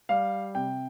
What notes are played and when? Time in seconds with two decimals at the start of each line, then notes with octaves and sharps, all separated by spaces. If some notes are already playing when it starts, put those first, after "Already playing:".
0.09 G3 F5
0.55 C3 G5